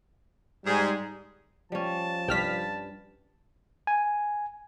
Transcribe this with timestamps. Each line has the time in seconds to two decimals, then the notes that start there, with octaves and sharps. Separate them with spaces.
0.66 G#2 G3 G#4
1.72 F3 G3 C#4 A5
2.28 C2 G2 G5 F6 B6
3.87 G#5